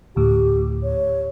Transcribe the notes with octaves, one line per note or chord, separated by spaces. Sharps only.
D2 A2 G4
C#5